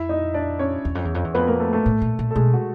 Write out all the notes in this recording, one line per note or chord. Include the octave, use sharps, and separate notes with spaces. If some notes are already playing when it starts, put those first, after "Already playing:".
Already playing: F2 E4 E5
D#4 D#5
D4 D5
C#4 C#5
E2
F2
E2
F2
E2
F2 B3 B4
A#3 A#4
A3 A4
A3 A4
A2
A#2
A#2
A4
B2 G#3 G#4
F#4